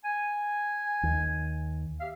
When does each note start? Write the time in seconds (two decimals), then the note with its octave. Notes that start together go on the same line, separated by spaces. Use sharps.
0.04 G#5
1.03 D#2
2.00 G4 E5 F5